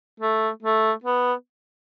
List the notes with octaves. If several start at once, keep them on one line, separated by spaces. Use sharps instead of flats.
A3
A3
B3